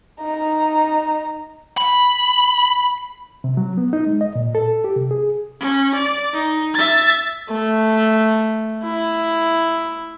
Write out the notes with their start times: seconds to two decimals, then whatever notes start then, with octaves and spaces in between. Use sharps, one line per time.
0.21 D#4 A#5
1.78 B5
3.44 C3
3.57 F#3
3.78 B3
3.93 D#4
4.06 G#3
4.21 D#5
4.36 A#2
4.55 A4
4.84 G4
4.96 C3
5.11 G#4
5.60 C#4
5.96 D5
6.33 D#4
6.74 E5 A6
7.49 A3
8.83 E4